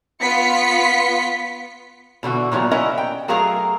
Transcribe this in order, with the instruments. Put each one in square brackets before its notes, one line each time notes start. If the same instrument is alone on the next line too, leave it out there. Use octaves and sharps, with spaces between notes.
[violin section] B3 F4 B6 C#7
[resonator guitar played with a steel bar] B2 D3 E3 F#4
A#2 E3 F#3 G3 A#5
C#4 E4 A#4 D#5 F#5
G5
F#3 A3 G#4 A#4 F5 A#5